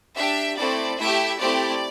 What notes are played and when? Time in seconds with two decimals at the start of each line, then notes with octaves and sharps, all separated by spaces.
0.16 D4 G4 E5
0.57 A3 C4 E4 D5
0.98 A3 E4 G4 E5
1.39 A3 C4 E4 G4 D5